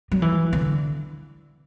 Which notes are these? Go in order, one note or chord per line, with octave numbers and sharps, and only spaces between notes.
F#3
E3
D3